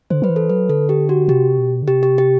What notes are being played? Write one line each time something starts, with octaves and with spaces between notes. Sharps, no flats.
D3 C5
F#3 B4
E3
A4
F#3 B4
D3 A4
G4
F#4
C3 G4
B2
D3
C3 G4
G4
G4